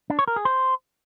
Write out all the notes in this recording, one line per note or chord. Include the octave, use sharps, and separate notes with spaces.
D4
C#5
A#4
G#4
C5